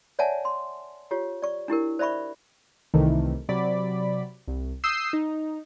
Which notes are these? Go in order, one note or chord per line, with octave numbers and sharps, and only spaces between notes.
C#5 D5 E5 F#5 G#5 A5
C6
F4 G4 C#5
D5 C#6
D4 E4 G4 A#4
C5 D5 E5 B5 C#6
C2 C3 D#3 E3 A3
C3 F#3 D5 B5
C2
D#6 E6 G6 C7
D#4